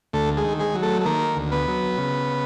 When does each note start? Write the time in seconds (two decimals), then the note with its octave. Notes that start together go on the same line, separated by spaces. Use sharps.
0.13 D2 A3 A4
0.37 G#3 G#4
0.44 D#3
0.60 G#3 G#4
0.75 F#3
0.82 A3 A4
1.01 A4
1.05 D#3 A#3 A#4
1.37 D2
1.52 B3 B4
1.68 F#3
1.98 C#3